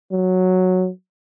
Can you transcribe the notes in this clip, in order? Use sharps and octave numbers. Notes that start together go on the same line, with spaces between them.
F#3